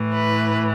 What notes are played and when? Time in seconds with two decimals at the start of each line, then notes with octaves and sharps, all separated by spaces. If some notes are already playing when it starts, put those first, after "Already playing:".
Already playing: A2 E3
0.14 B4